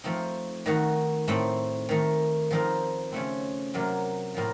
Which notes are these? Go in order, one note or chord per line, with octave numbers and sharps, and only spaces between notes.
F3 A3 C4 D#4
D#3 A3 D#4 F#4
A2 A3 C4 D#4
D#3 A3 D#4
F3 C4 D#4 A#4
C#3 A3 C4
C3 F#3 A#3 F4
A2 F3 C4 A#4